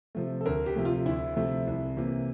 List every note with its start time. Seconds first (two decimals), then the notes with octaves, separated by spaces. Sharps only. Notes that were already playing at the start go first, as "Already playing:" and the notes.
0.15 C3 F3 A3
0.41 A4
0.46 D2 A#4
0.66 G4
0.75 C3 F3 A3
0.85 F4
1.06 D2 E4
1.36 C3 F3 A3
1.67 C2
1.97 C3 E3 A#3